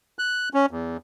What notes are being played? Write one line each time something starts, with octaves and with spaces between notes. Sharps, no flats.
F#6
C#4
E2